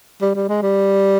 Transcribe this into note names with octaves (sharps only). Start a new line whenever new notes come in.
G3
G3
G#3
G3